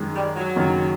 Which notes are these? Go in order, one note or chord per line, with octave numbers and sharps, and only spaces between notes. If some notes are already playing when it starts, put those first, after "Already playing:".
Already playing: F#2 D#3 G#3
G3
F#3
F#1 F#2 D#3